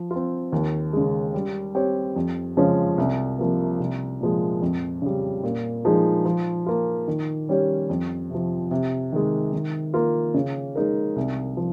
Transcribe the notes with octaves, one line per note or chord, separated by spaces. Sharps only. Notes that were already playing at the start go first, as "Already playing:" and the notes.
Already playing: F3
F4
C4
D#2
C#3 G#3
G3
C4 G4 C#5
F2
C#3 F3 G#3 C#4
C2
C3 F3 A#3
C2
A#2 F3 G#3
F2
C#3 G3
A#2
F3 G#3 D#4 G#4
F3
A#3 F4
D#3
G3 C#4 G4 C#5
F2
C3 F3
C3
D#3 G#3
D#3
A#3 F4
C#3
G#3 D#4 A#4
C2
F3